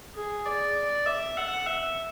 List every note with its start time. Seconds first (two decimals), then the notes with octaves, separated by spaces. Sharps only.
0.16 G#4
0.46 D5
1.06 E5
1.37 F#5
1.67 E5